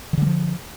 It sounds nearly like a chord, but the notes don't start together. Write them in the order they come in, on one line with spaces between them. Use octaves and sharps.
D#3 D3 G#3 F3